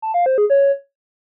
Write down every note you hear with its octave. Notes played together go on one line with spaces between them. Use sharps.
A5
F5
C5
G#4
C#5